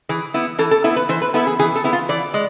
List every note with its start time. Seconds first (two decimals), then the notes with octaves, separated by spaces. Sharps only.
0.09 E3 G#4
0.34 B3 E4
0.59 E3 A4
0.71 A4
0.84 B3 E4 A4
0.96 B4
1.09 E3 C5
1.22 B4
1.34 B3 E4 A4
1.47 G#4
1.59 E3 G#4
1.76 A4
1.84 B3 E4
1.93 F4
2.09 E3 D5
2.34 G#3